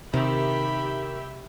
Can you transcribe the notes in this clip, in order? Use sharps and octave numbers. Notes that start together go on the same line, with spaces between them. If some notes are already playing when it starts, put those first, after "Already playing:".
C3 D#3 G4 E5 B5